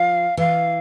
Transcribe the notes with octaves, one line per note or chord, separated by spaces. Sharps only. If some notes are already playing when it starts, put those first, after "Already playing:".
Already playing: F3 F5
E3 F5